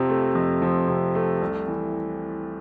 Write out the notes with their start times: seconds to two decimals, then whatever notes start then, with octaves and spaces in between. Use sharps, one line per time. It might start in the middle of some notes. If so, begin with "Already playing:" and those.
Already playing: F2 C3 F3
0.10 A3
0.35 F2
0.62 F3
0.88 C3
1.15 A3
1.42 C2
1.67 E3